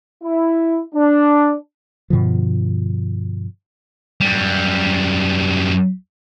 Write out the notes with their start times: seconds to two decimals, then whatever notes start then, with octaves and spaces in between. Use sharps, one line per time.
0.23 E4
0.95 D4
2.10 G2 B2 D3 F3
4.21 F#2 G3